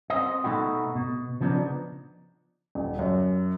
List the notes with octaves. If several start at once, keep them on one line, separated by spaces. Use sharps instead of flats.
C4 D#5
B2 A3 D#4 E4 F#4
B2
C#3 F3 B3 C4 D4 D#4
D#1
F#2